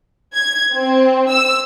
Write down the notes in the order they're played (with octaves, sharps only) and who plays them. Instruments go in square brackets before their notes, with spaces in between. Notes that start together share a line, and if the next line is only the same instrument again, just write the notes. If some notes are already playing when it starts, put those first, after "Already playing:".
[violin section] G#6
C4
E6